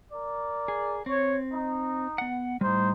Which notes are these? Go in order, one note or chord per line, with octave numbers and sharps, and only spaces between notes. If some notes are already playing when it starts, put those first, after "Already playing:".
A#4 D5
G#4
C4 C#5
D#4
B3 F#5
A2 G3 D#4 C5